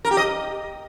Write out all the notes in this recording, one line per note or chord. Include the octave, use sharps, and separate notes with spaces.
A#4
G4
D#5